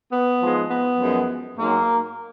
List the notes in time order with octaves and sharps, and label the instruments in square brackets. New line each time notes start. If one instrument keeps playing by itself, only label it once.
[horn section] B3
G#2 F3 G#3
B3
F#2 F3 G#3
G#2 F#3 A#3